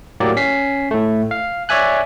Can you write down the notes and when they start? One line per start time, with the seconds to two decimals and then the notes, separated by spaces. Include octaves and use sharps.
0.20 A2 F#3 A#3 G4 D5
0.36 C#4 B6 C7
0.91 A2 A3
1.31 F5
1.69 C#5 D5 E5 G#5 F#6